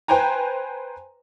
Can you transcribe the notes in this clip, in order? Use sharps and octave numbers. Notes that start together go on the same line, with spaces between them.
B4 C5 G5 G#5 A#5